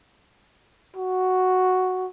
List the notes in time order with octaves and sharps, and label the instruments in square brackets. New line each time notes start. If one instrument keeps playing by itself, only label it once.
[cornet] F#4